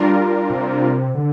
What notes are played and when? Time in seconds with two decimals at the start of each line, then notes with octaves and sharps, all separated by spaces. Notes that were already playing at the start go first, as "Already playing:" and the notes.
Already playing: G3 D4 F4 A#4
0.50 C3
1.15 D3